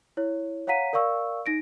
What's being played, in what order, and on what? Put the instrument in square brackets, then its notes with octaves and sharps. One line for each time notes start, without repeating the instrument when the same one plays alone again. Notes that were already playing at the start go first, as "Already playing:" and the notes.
[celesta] E4 C#5
C#5 F5 F#5 A#5 B6 D#7
A#4 D5 F5 C#6 E6
D#4 A#6 D7